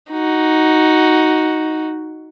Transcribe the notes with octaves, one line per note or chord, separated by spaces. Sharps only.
D#4 F#4